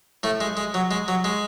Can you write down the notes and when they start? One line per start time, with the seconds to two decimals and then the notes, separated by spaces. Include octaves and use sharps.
0.23 A2 A3
0.41 G#3
0.57 G#3
0.74 F#3
0.91 G#3
1.08 F#3
1.24 G#3